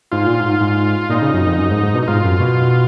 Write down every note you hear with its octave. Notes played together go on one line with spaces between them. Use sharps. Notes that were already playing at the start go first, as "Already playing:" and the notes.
G#2 F4
A#2
G#2
G#2
A#2 D#4
C#3
F#2
F2
F#2
G#2
G#2
B2
D#4
G#2 F4
F#2
B2